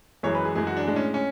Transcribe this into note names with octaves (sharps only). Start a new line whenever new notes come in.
F#2 E3 G#3 C#5
B4
G#4
F#2 E3 G#3 G#4
F#4
D4
G#3 D4
A2 C#4
C#4